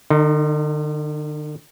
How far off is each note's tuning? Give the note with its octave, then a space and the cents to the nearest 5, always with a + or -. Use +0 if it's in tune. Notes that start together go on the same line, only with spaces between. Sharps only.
D3 +45 D#4 +0